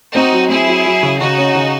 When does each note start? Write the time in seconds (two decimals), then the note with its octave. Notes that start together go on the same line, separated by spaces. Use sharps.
0.14 C4 D#4 F#4
0.32 F#3
0.49 C4 E4 G#4
0.67 F#3
0.86 F#3
1.03 C#3
1.21 C#3 D#4 F#4
1.38 C#4
1.55 C#3